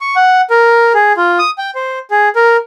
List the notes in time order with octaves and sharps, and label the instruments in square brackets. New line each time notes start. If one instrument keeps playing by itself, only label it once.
[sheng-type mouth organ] C#6
F#5
A#4
G#4
F4
D#6
G5
C5
G#4
A#4